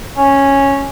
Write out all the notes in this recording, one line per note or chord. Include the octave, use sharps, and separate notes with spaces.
C#4